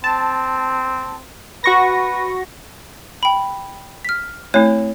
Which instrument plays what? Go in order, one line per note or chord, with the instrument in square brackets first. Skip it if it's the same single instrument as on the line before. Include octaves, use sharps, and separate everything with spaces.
[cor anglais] C4 [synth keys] A5
[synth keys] F#4 C#6 A#6 [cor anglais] B4
[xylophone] G5 B5
F6 B6
[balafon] A3 C4 E4 [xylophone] C#5